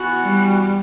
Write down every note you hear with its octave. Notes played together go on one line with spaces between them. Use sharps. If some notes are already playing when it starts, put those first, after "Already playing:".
Already playing: E3 B3 F#4
G3